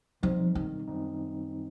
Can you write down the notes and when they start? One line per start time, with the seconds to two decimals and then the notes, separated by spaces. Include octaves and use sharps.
0.23 C2 B2 F3 G3 C4 D#4
0.55 D#3
0.87 F#2 D#3 G3 C4 D#4